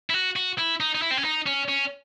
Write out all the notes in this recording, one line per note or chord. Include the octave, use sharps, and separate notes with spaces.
E4
F#4
F#4
E4
D#4
D#4
E4
C4
C#4
D#4
C#4
C#4